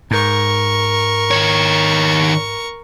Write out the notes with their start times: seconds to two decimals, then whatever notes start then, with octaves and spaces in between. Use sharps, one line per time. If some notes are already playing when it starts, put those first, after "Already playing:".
0.11 G#2 A#4 C#6
1.31 D#3 C#5